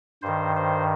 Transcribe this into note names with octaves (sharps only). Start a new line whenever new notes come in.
G2 D#3 C5
C5